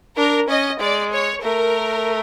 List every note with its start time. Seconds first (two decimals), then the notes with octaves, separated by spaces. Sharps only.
0.17 D4 A#4
0.48 C#4 D#5
0.80 G#3 D5
1.12 C#5
1.42 A3 A#4